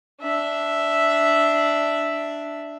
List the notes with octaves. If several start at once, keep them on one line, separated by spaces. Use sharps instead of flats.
D4 E5